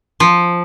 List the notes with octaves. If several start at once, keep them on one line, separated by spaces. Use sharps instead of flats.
F3